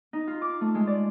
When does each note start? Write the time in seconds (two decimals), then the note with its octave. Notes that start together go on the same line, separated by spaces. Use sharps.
0.13 D#4
0.27 F4
0.42 D6
0.61 A3
0.75 G#3
0.87 D5